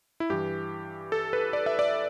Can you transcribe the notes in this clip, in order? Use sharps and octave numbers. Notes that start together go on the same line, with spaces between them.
E4
G2 E3 G4
A4
B4
D5
E5
D5